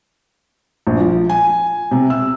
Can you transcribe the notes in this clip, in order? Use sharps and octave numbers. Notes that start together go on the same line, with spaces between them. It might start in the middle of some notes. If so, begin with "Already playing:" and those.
A#1
F3
G#5
C3
E6